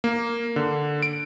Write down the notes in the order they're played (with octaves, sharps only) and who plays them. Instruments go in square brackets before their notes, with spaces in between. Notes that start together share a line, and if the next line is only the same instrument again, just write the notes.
[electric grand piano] A#3
D3
D7